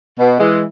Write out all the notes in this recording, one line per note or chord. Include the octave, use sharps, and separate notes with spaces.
B2
E3 G#3